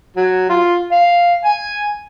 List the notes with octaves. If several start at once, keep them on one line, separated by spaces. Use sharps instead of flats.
F#3
F4
F5
G#5